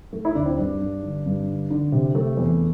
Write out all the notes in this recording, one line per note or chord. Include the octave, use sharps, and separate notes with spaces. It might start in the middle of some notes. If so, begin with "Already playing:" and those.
A3
E4
D2 D4
C4 E4
G2 D4
G2
D3
G2
D3
D3
C3
A3
E2